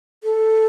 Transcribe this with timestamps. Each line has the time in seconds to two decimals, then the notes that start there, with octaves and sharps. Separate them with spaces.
0.24 A4